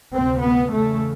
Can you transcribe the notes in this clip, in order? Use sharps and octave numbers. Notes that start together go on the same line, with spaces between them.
D2 C3 C4
B3
E2 C#3 A3